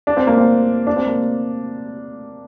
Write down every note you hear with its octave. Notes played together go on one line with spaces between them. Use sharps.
D4
C4
A#3
C4
D4
C4
A#3